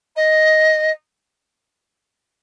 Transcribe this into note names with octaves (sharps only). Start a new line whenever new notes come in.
D#5